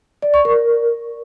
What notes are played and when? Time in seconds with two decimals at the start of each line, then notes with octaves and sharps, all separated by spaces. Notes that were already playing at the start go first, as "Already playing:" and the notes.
0.22 D5
0.34 C#6
0.45 A#4